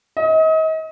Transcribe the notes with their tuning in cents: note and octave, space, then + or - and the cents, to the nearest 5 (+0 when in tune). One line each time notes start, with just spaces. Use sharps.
D#5 +35